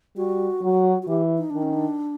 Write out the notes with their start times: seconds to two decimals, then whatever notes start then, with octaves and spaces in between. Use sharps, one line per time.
0.16 G3 F#4
0.62 F#3
1.03 F#4
1.07 E3 G4
1.38 D#4
1.50 D#3 D4
1.62 C#4
1.74 D4